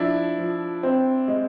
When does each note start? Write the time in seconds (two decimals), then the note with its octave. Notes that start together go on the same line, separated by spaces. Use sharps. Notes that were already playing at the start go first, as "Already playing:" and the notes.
Already playing: F3 D4 E4
0.38 F3
0.83 C4
1.28 G#3